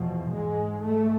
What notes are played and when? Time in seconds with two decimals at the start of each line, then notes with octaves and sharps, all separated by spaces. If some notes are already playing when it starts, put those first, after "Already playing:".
Already playing: E2 B2 F3
0.31 G#2 G#3
0.82 G#2 A3